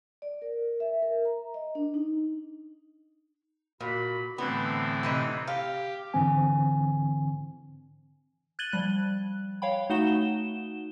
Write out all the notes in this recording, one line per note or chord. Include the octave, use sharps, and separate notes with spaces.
D5
A#4
E5
A#4
A#5
D#5
D4
D#4
A#2 F#4 B5
A2 D3 E3 B3 C4
C3 D#4 B4
G4 F5
G#2 D3 E3 C4 G#5
F#6 G#6 A6 D#7 F#7 G7
F3 G3 F#6
C#5 F5 G5 B5
A3 D#4 F#4 F#5 E7 G7